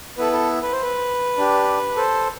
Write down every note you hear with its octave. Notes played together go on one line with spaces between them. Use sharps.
B3 E4 A4 B4
A4
B4
C5
B4
D4 G4
A4 C5